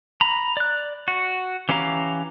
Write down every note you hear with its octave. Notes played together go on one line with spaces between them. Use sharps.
A#5 B5
D5 F#6
F#4
E3 C#4 G4 F5 A#5